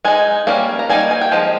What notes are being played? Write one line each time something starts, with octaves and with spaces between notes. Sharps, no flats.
G#3 D#4 G#5
G3 A#3 C#4
A#5
G3 A#3 D#4 G#5
G#5
G5
F3 G#3